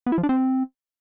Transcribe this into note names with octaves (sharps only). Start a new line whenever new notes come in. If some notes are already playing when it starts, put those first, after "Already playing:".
B3
E4
F3
D4
C4